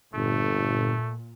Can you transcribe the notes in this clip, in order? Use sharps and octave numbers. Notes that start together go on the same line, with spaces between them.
G1 A#2 A3